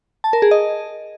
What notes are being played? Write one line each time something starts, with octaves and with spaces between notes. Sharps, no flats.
A5
A#4
G#4
D#5